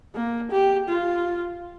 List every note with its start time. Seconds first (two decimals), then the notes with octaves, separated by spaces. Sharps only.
0.14 A#3
0.51 G4
0.88 F4